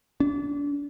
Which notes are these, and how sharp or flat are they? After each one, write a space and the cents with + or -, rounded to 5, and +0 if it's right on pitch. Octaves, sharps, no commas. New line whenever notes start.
D4 -30